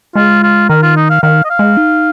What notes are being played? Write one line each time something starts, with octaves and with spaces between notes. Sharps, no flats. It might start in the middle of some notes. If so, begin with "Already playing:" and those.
G#3 F4
F4
D#3 A#4
F4
D#4
F5
D#3 F5
D#5
F5
G#3
D#4